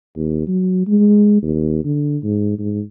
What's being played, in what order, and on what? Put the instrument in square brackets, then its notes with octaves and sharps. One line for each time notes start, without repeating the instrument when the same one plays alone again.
[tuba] D#2
F#3
G#3
D#2
D3
G#2
G#2